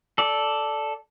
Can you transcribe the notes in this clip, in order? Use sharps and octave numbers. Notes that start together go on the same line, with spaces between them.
A4 D5